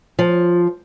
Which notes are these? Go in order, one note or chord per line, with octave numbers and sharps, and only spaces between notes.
F3